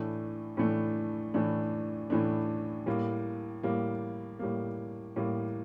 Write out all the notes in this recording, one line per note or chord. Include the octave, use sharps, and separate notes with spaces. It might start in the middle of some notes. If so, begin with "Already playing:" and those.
Already playing: A2 E3 A3 D4
A2 E3 A3 D4
A2 E3 A3 D4
A2 E3 A3 D4
A2 G3 A#3
A2 G3 A#3
A2 G3 A#3
A2 G3 A#3